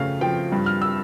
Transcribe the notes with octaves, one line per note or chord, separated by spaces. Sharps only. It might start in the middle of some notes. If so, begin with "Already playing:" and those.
Already playing: F2 C#3 A3 F5
F3 G5
G2
F6
E6